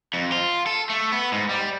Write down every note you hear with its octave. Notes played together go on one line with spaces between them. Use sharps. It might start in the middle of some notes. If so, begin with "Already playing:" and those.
F2
F4
A4
A3
B3
G#2
G3